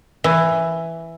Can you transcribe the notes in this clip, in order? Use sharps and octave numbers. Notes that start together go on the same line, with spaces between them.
E3